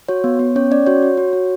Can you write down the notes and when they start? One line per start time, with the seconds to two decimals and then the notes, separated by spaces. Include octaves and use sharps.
0.09 F#4 C#5
0.24 B3
0.39 B3
0.56 C#4 C#5
0.71 C#4 D5
0.86 F#4 C#5
1.03 F#4
1.17 F#4
1.33 F#4